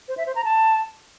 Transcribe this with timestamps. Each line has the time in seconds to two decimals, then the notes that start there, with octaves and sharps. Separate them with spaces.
0.08 C5
0.17 E5
0.26 C5
0.35 A#5
0.45 A5